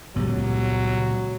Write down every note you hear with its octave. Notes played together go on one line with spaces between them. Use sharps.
C#2 A#2 F#3 G3 B3